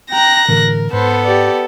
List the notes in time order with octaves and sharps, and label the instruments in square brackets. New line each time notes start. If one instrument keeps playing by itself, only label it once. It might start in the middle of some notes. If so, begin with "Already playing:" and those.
[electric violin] G5 A#5 [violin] F#6 A#6
[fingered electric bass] A2 D3 E3 [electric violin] A#4
[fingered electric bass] G#2 [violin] B3 A4 [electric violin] B4 C5
[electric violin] G4 D5